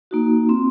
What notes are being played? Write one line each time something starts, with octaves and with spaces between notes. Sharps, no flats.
A#3 D#4 F#4
C4 F4